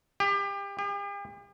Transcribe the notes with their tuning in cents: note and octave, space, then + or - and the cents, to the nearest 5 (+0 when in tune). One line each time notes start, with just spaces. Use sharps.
G4 +30
G4 +45